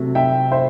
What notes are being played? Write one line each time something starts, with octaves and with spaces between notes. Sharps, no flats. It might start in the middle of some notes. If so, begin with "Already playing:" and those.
Already playing: C3 F#3 A3
E5 G5
C5 E5